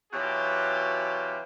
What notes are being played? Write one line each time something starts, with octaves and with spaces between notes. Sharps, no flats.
B2 E3 F#3 F4 G4